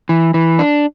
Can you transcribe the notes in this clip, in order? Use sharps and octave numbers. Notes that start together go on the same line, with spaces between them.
E3
E3
D4